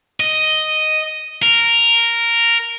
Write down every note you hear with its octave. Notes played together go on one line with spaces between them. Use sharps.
D#5
A#4